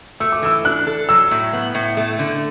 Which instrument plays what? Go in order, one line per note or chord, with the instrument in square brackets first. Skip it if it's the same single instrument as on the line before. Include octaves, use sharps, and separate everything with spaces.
[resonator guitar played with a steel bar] A3 [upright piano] E6
[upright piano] D6
[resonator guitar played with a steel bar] E3 [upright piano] E6
[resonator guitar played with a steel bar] D4 [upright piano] F#6
[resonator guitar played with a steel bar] A4
[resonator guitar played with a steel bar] F#3 [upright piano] E6
[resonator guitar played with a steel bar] A2
B3
A2
A3
D3